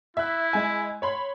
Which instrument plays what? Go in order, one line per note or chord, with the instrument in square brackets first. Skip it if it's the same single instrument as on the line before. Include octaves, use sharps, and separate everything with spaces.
[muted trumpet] E4 [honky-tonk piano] E5 F#6
[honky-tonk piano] G#3 G#5
C#5 B5 C6